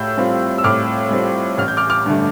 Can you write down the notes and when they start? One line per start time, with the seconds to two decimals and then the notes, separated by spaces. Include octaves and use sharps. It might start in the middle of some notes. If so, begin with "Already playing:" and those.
Already playing: A2 E6 G6
0.17 G3 C4 F4
0.58 E6
0.64 A2 D6 F6
1.11 G3 C4 F4
1.58 A1 F6
1.68 G6
1.77 D6 F6
1.90 D6 F6
2.06 G2 D3 A3